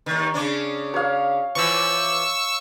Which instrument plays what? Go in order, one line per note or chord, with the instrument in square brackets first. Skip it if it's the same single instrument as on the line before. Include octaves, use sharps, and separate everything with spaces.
[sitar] D#2 D#3
C#3 C#4 D4
[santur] C#5 F5
[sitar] E3 F3 [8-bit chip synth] C#6 E6